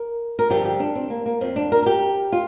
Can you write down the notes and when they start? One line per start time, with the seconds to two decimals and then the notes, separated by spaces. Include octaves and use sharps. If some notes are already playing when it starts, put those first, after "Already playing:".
Already playing: A#4
0.39 A#4
0.49 G2 D3 F3 G4
0.65 G4
0.80 D4
0.95 C4
1.10 A#3
1.26 A#3
1.41 F2 F3 C4
1.56 D4
1.72 A#4
1.82 A#4
1.86 G4
2.32 F4